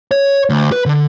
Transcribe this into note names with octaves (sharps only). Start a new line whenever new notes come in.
C#5
D2
B4
D3